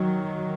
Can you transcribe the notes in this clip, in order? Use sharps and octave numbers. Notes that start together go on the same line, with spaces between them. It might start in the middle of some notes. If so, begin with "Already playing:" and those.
Already playing: D#3 F#3